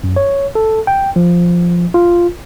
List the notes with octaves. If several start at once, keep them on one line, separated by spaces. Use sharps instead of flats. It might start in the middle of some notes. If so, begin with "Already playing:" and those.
F#2
C#5
A4
G5
F3
F4